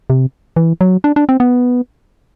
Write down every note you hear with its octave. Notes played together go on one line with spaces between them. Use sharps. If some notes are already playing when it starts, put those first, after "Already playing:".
C3
E3
F#3
D4
D4
C4
B3